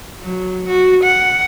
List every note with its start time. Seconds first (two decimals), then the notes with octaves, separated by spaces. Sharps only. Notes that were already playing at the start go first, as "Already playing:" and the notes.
0.22 F#3
0.68 F#4
1.03 F#5